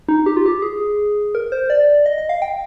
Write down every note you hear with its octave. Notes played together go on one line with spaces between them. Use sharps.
D#4
G4
F4
G4
G#4
A#4
C5
D5
D#5
D#5
F5
G5